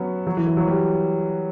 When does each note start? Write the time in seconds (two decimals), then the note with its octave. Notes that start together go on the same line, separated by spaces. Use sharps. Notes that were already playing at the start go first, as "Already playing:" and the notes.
Already playing: F#3 B3 C#4
0.27 F#3
0.37 E3
0.47 E3
0.57 F#3
0.68 G3